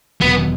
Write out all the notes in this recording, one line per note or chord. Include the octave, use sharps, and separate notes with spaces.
E1 E2 B2 F#3 B3